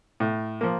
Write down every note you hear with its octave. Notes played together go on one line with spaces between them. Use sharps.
A2
F3 A#3